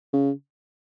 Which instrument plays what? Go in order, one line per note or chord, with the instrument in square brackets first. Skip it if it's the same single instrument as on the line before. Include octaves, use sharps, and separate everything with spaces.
[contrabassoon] C#3